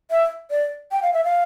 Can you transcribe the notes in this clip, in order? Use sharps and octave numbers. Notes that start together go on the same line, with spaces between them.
E5
D5
G5
F5
E5
F5